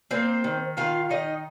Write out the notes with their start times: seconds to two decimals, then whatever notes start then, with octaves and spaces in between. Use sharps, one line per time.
0.11 A#3 C4 C5
0.44 D#3
0.77 D#3 F4 F5
1.09 D#3 D#4 D#5